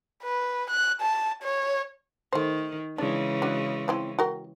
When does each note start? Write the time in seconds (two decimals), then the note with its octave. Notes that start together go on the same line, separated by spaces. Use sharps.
0.23 B4
0.70 F#6
1.01 A5
1.43 C#5
2.33 D#3 A3 C5
2.98 C#3 E3 G#3 D4
3.42 D4 F#4
3.88 F3 C4 E4
4.19 F#4 A#4 G5